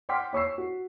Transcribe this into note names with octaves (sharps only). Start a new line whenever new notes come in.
F#5 G5 C6 D6 F6 B6
C#5 C#6 E6 C7
F#4